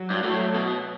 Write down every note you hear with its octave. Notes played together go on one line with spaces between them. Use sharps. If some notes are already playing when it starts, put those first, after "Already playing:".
Already playing: F#3
G2
A2
B2